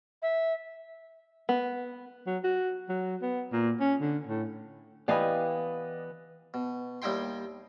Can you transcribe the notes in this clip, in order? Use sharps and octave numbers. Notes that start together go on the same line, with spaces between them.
E5
B3
F#3
F#4
F#3
B3
A#2
C#4
D3
A2
E3 B3 G4 D5 D#5 F5 G#5
B2
D#2 G3 D#4 E4 G5 C6